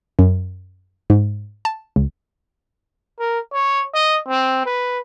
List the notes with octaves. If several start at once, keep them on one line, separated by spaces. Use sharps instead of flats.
F#2
G#2
A5
C#2
A#4
C#5
D#5
C4
B4